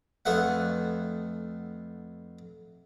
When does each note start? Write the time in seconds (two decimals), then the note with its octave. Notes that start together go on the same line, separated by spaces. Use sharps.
0.25 F2 A3 B3 F#5